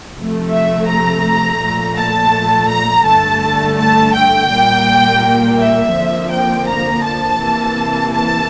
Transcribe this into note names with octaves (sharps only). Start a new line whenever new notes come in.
C3 F3 A3
E5
A#5
A#2 F3 A3
A5
A#5
G2 D3 A3 A5
A5
G5
A#2 G3 A#3
E5
F2 D3 F3 A#3
G5
A#5
A5
C3 E3 A#3
A5